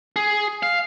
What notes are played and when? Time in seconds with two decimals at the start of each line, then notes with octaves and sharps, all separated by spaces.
0.16 G#4
0.63 F5